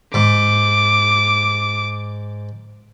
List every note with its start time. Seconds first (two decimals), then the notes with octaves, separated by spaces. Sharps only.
0.14 G#2 D6